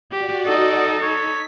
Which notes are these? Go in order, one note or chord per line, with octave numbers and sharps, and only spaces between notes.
F#4 G4 D5
D#4 A4 D#5
C#5 B6